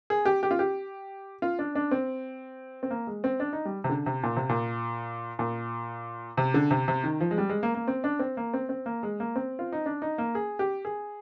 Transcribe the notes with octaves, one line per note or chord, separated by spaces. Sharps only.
G#4
G4
G4
F4
G4
F4
D4
D4
C4
C4
A#3
G#3
C4
D4
D#4
G3
C3
D3
C3
A#2
C3
A#2
A#2
C3
D3
C3
C3
D#3
F3
G#3
G3
G#3
A#3
A#3
C4
D4
C4
A#3
C4
C4
A#3
G#3
A#3
C4
F4
D#4
D4
D#4
A#3
G#4
G4
G#4